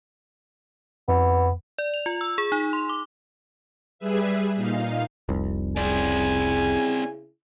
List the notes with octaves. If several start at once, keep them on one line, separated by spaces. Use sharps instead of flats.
F2 B3
D5
F7
F4
E6
G#4
D#4
C6
D6
G3 G#4 B4 E5
A#2 D#4 F5
F1 C2
C#3 C4 E4 G#4 D5 G#5